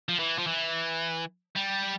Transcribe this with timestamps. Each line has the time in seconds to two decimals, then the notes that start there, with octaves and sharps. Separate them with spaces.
0.09 F3
0.19 E3
0.38 F3
0.47 E3
1.56 G3